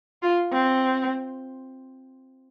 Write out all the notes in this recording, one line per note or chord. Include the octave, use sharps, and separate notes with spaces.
F4
C4